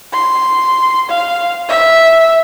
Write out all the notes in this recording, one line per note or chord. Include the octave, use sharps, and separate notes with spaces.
C6
F5
E5